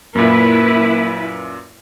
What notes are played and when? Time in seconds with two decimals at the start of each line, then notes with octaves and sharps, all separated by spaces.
0.15 F#2 A#2 A#3 E4 B4